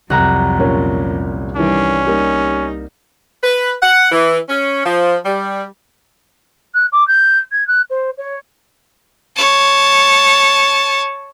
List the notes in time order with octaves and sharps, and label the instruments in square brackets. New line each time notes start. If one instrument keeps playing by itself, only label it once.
[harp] C2 F#5 A#5 [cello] F2 F#3
[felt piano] A#2 A#3 C#4
[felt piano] D#3 E3 [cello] G3 D4 [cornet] C#4
[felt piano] G3 A#3 [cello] D#4
[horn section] B4
F#5
E3
C#4
F3
G3
[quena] F#6
D6
G6
G#6
F#6
C5
C#5
[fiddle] C#5 A5